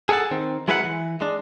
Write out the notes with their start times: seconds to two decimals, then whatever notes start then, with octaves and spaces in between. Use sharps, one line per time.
0.09 G#4 A4 D5 F#5 A5
0.31 D#3 C4
0.68 F#3 G#3 E4 B4 F5 F#5
0.85 E3
1.21 G#3 D4